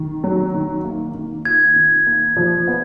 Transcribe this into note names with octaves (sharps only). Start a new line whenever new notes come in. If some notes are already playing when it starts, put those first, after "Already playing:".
Already playing: D#3
F#3
D#3
A#3
D#3
F4 G#6
D#3
A#3
F3
B3